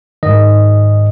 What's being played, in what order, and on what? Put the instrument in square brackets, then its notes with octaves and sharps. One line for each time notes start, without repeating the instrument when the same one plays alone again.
[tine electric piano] G#2 D#3 D#5